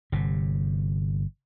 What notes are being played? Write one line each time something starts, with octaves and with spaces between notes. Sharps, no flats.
G1 C3